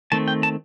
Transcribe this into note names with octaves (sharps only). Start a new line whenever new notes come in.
D#3 A3 C4 A5
G5
A5